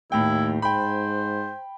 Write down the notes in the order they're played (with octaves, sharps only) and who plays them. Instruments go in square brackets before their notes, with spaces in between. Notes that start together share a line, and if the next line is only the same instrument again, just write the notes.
[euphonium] D#2 [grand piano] A2 G5 [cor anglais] E4
[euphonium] G#2 [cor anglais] C5 [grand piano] G5 B5